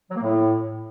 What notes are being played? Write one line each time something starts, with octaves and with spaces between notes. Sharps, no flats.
F#3
A#3
A2